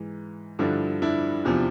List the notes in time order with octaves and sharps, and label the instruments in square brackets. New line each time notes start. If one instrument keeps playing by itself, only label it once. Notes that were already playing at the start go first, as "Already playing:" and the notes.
Already playing: [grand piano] G#2 E3
G2 D3 F3 D4 E4
D4 E4
E2 C3 F3